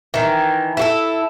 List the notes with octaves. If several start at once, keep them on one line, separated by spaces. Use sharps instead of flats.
D#3 E3
E4 F#4 A4